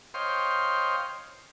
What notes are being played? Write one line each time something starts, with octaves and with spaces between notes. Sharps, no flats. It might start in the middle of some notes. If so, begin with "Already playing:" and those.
C5 C#5 D#5 F5 G5 C6